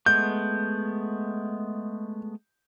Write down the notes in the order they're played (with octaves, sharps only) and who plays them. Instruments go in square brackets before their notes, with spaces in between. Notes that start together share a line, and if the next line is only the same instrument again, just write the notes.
[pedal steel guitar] G#3 A3 B3 [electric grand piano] G6